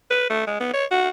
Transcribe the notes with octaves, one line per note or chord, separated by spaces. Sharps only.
B4
A3
G#3
B3
C#5
F#4